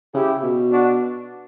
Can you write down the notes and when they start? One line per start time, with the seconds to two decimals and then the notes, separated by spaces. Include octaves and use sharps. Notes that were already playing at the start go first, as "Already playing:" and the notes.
0.14 C#3 E4 G4
0.43 B2
0.71 D4 F#4